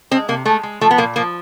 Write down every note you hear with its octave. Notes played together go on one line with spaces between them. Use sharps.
G#3 C4
C3 A#3
G#3 A3
G#3
F3 A3
B3
A#2 A#3
F3 A#3